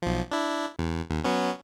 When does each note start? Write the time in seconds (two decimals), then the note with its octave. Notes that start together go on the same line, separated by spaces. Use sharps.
0.02 B1 F3
0.32 D4 E4
0.79 E2
1.10 D#2
1.24 F#3 B3 C#4